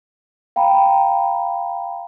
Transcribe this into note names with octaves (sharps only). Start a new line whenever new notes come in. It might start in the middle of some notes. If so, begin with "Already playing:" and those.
F5 G5 A#5 B5